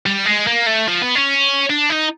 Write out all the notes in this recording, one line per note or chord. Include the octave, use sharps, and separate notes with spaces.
G3
G#3
A#3
A3
F3
B3
C#4
D4
D#4